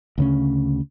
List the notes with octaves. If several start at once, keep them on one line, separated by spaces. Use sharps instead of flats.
D2 C#3 C#4